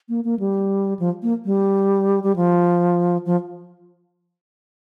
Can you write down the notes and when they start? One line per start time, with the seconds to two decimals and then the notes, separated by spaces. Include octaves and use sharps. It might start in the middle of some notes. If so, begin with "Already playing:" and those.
0.09 A#3
0.24 A#3
0.40 G3
0.99 F3
1.23 A#3
1.45 G3
2.23 G3
2.36 F3
3.26 F3